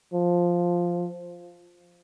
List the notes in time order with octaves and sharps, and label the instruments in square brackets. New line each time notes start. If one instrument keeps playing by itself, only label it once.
[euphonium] F3